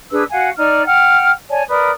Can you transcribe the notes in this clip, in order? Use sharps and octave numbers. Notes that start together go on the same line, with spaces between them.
D4 G#4 B4 E6
F#4 F5 F#5 G#5
D#4 D5 F6
F#5 G5 F6
C#5 D5 G#5 A5
A#4 B4 D5 D#6